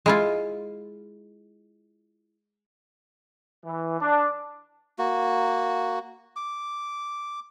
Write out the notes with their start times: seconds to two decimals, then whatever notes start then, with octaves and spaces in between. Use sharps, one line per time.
0.06 G#3 E4 F4
3.64 E3
4.00 D4
4.98 A#3 F#4
6.36 D6